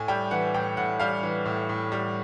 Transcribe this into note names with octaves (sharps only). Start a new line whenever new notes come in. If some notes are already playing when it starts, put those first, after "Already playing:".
Already playing: A2 G#5
G3 G5
E3 F#5
A2 G5
A2 F#5
G3 F5
E3
A2
A2
G3